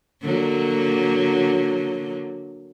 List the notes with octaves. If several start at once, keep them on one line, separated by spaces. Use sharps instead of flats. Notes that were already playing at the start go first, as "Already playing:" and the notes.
D3 F#3 A#3